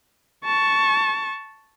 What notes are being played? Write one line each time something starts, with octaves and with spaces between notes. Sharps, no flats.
A5 C#6